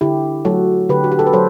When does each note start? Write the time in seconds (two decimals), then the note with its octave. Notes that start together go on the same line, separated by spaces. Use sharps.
0.01 D3 E4 G4
0.45 F#3 A3 F#4 A4
0.89 D3 G4 B4
1.04 F#4
1.12 G4
1.19 A4
1.27 B4
1.33 F#3 A4 C5